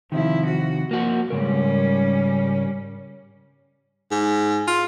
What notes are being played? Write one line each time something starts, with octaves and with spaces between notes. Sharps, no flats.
C3 D#3 F3 E4
F#4
F3 A#3 F#4
G#2 C#3 G3 C#4 A#4
G#2
F4